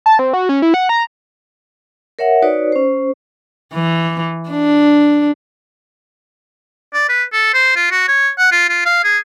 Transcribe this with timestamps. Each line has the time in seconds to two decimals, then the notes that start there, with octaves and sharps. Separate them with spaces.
0.06 A5
0.19 C4
0.33 F#4
0.49 C#4
0.62 E4
0.74 F#5
0.89 A#5
2.19 A#4 C#5 E5 F#5
2.42 D#4 F#4 B4 C#5 D5
2.72 C#4 C5
3.74 E3
4.50 D4
6.94 D5
7.09 B4
7.32 A4
7.54 C5
7.76 F4
7.91 F#4
8.08 C#5
8.38 F#5
8.52 F4
8.69 F4
8.85 F5
9.04 G#4